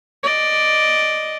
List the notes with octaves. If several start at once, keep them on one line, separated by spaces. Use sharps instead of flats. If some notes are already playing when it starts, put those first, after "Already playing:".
D5 D#5